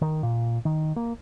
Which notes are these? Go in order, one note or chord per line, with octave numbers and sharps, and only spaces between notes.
D#3
A#2
D#3
A#3